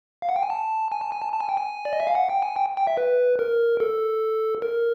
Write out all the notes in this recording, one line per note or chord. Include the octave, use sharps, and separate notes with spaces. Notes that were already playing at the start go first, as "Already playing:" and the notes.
F5
F#5
G5
G#5
A5
G#5
A5
G#5
A5
A5
G#5
G5
G#5
D5
D#5
E5
F5
F#5
G5
G#5
G5
G5
E5
B4
A#4
A4
A#4